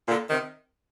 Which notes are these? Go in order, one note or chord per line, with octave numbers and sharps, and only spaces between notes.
A#2 D3
C3 D#3